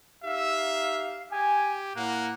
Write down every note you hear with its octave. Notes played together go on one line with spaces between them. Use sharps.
D#4 G4 E5 F5
G4 G#5
A2 A#3 F#5